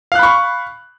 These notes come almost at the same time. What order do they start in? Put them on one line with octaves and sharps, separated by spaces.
F5 F#6 B5 C#6